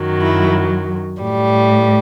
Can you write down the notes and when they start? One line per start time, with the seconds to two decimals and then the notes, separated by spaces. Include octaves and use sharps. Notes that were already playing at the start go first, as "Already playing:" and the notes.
Already playing: F#2 D#3 F#3
0.22 E4
1.21 A2 G3